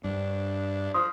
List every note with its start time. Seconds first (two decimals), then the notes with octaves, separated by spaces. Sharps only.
0.04 G2 D4
0.94 F3 C6 D#6